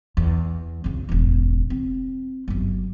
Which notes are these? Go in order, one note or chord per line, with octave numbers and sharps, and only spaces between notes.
E2
F2 C#3
E1 A1
C4
G1 F#2